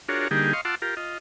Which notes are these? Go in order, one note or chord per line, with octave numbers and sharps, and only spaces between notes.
D4 F4 F#4 G#4 A#4 C#5
D3 G3 A#3 D#4 G4 G#4
D#5 F5 C6 C#6
F4 F#5 A5 C6 D6 E6
F4 G4 A#4
F4 D#5